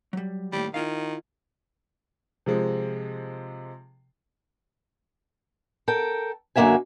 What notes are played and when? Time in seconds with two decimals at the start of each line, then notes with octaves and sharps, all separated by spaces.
0.13 F#3 G3
0.52 D#2 A2 G3
0.74 D#3 E4 F4 F5
2.46 C3 F3 G#3
5.88 A4 A#4 G5
6.56 F#2 D3 A#3 F4 E5 G#5